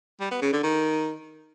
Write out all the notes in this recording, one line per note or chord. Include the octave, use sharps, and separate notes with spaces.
G3
B3
C#3
D3
D#3